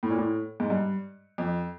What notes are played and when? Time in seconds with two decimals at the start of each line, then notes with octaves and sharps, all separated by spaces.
0.03 A2
0.10 A#2
0.18 A2
0.60 G#2
0.70 G2
1.38 F2